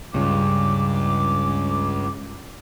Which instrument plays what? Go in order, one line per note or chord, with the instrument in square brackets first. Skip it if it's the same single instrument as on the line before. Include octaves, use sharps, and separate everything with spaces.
[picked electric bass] C#2 C#3 [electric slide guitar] G2 [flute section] D6